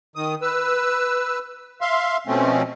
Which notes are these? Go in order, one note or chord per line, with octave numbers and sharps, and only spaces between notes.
D#3 D#6
B4 E6
E5 F5 C6
B2 F3 A3 C4 C#4